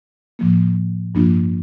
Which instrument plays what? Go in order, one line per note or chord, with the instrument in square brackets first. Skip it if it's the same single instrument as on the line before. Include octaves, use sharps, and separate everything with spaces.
[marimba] A2 F3 A#3
G2 F3 A#3 D4 F4